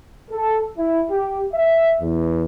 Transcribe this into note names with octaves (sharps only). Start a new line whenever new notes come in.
A4
E4
G4
E5
E2